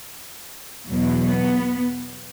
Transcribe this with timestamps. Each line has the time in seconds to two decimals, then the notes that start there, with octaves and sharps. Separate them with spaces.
0.88 E2 B2 F#3
1.27 B3